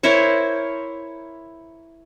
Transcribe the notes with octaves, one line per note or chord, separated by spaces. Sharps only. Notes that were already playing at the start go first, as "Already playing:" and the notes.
E4 A#4 C5 C#5